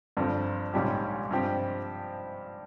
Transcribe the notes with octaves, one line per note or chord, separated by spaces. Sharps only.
G1 G2 F3 C4
A#1 G#2 G3 C#4 G4
G2 F3 C4 G4